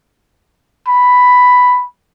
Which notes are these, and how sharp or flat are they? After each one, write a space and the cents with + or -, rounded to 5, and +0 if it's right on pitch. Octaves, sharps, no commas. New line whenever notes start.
B5 +5